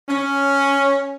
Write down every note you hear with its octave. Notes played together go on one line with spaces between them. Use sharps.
C#4